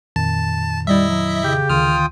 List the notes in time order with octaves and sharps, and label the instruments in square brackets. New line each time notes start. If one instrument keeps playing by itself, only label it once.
[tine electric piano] F2 A#2 D#3 [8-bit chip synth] A5
[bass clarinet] G3 [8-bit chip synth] E4 D#5 E5
[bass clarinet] F#3
[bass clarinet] C#3 [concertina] G4
[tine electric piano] D2 D3 D#3 [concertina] F4 G5 D#6 [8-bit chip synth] F6